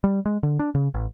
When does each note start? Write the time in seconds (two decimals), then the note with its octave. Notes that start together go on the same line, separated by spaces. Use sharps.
0.04 G3
0.26 G#3
0.43 D3
0.59 D4
0.75 C#3
0.94 A1